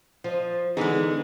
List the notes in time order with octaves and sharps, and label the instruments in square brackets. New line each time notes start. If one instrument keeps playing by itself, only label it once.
[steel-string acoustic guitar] F3 [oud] C5 D#5
[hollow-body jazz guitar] D3 B3 D#4 [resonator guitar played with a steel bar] E3 G#3 [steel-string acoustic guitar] G#4